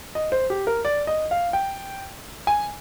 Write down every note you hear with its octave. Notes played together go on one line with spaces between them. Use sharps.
D#5
C5
G4
A#4
D5
D#5
F5
G5
G#5